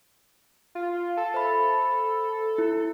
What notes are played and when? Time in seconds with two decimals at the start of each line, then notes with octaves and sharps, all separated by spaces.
0.75 F4
1.17 A4
1.34 C5 E5 B5
2.58 E4